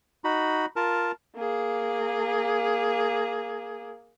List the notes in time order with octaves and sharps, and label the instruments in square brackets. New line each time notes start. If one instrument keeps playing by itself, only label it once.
[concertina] D#4 F#4 B5
F4 A#4 A5
[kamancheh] A#3 G#4